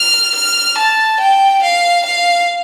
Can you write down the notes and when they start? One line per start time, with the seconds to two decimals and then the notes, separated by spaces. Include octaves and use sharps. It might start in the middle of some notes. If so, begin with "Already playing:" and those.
Already playing: F6
0.35 F6
0.78 A5
1.21 G5
1.63 F5
2.06 F5